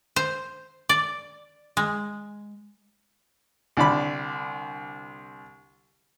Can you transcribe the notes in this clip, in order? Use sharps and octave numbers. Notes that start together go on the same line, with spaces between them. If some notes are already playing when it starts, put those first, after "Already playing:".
C5
D5
G#3
C2 D3 D5 B5